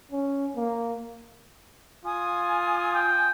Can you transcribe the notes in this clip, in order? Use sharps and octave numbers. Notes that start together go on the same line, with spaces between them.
C#4
A#3
F4 G#5 D#6
G5